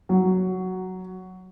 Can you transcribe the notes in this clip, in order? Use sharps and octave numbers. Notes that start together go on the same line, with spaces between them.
F#3